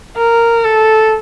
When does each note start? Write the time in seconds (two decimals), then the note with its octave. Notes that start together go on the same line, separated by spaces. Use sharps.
0.17 A#4
0.64 A4